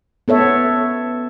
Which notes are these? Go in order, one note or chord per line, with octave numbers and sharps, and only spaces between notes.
B3 A4 C#5 E5